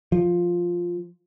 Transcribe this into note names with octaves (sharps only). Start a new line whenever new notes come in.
F3